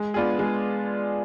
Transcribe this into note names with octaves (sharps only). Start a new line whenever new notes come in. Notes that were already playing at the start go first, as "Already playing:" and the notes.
Already playing: G#3
B3 D4 F4 G#4
G#3